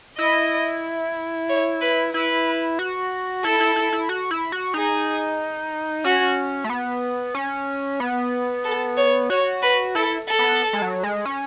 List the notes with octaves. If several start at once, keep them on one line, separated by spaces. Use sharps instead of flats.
E4 D#5
C#5
B4
E4 B4
F#4
E4 A4
E4
E4
E4
F#4
E4
F#4
D#4 G#4
C#4 F#4
A3
B3
C#4
B3
A4
C#5
F#4 C#5
B4
E4 A4
A4
B3
G#3
F#3
G#3
C#4